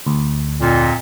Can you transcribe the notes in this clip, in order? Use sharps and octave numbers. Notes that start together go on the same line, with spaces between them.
D2
F2 A#2